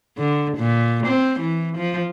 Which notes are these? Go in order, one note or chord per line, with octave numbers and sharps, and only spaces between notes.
D3
A#2
C4
E3
F3